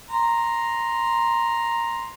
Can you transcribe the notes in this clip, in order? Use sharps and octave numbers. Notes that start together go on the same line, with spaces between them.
A#5 C6